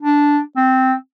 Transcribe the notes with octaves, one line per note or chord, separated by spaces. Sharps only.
D4
C4